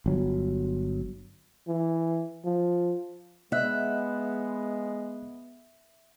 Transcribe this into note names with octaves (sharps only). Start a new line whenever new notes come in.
G1 F#3
E3
F3
G#3 B3 D#5 E5 F#6